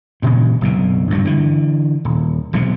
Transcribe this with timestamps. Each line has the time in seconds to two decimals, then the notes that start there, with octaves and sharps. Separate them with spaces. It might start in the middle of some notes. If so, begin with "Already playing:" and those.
0.22 G2 A#2 C#3 E3
0.61 F#1 B1 B2
1.11 G2 B2 D#3 F#3
1.25 D3 E3
2.05 D#1
2.53 E1 B1 G#2 C3